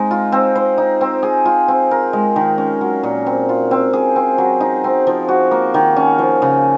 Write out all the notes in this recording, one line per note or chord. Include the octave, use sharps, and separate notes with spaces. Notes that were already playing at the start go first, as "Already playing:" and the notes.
Already playing: G#3 C4 D#4
F4
C4
C5
D#4
C4
G#4
F4
C4
A#4
G#3
D#3
C#4
F#3
A#2
C4
F4
C4
G#4
C4
F#3
D#4
C4
F3
F#4
A#3
D#3
C#4
F3
C#3